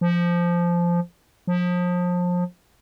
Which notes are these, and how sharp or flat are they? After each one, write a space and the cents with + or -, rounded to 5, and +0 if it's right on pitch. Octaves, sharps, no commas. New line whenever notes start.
F3 -10
F3 +30